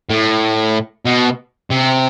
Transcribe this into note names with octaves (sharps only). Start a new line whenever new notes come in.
A2
B2
C3